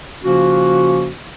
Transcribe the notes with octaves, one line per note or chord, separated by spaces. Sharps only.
C#3 F3 A#3 C#4 F4 F#4